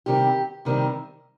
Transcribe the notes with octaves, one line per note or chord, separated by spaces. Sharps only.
C3 D#3 G3 C4 G4
C3 D#3 G3 C4